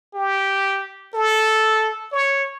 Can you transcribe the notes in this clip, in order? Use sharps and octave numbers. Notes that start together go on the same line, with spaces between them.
G4
A4
C#5